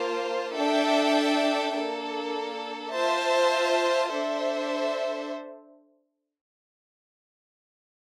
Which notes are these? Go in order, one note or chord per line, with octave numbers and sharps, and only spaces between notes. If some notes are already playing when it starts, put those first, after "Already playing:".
Already playing: A#3 F4 C5 F5 A5
D4 A4 E5 G5
A#3 D4 A4
F4 C5 E5 A5
D4 A4 C5 E5